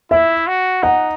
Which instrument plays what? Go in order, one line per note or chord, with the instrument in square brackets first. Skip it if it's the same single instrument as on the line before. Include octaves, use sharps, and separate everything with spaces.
[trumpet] E4 [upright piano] E5
[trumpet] F#4
[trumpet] D#4 [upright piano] F#5